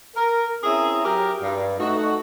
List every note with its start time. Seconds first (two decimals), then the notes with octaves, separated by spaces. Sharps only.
0.15 A#4
0.64 C4 C#4 E4 G#4 E5 A#5
1.05 F#3 G4 A#4
1.42 G2
1.78 A3 D#4 F#4